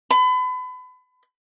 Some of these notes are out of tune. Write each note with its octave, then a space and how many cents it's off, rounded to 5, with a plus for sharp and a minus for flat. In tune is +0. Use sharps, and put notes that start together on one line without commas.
B5 +35